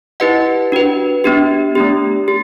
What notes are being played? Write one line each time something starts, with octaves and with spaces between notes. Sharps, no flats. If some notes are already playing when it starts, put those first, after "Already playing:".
E4 G4 B4 D#5 F#5
D4 F#4 B4
B3 D4 G4
A3 D4 G4
G4